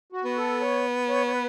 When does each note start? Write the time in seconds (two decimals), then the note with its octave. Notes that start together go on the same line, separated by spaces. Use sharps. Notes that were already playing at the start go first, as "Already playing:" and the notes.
0.12 F#4
0.24 B3
0.37 A4
0.61 C#5
1.09 C#5
1.27 C#5
1.33 B4